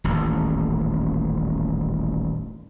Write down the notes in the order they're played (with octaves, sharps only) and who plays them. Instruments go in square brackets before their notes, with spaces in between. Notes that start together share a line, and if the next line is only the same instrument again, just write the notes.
[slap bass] D#1 A1